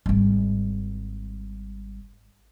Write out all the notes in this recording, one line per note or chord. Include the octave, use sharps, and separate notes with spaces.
G#1 G3